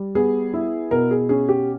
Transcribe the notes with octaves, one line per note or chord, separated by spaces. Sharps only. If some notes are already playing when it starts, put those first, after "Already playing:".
Already playing: G3
B3 G#4
E4
B2 A#4
G#4
C#4 G#4
G4